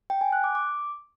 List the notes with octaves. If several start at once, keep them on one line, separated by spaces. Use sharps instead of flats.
G5
G#5
F#6
D6
D6